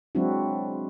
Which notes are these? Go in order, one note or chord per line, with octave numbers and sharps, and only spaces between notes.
F#3 G#3 C4 D4 E4 F#4